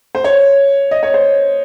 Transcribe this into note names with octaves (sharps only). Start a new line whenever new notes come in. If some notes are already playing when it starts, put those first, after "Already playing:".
C5
C#5
D#5
C#5
C5